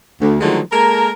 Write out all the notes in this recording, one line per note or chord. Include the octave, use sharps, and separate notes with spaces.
D2
D3 D#3 F3 F#3 G#3 A3
G#3 A#3 A4 A#4